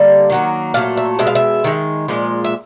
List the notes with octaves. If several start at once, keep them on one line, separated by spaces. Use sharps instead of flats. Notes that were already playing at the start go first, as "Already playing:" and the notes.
Already playing: D3 G3 A#3
D#3 F#3 A#3
A#2 F#3 A3 F5
E5
B2 G#3 E5
F5
E5
D#3 G#3
A#2 F3 G#3
E5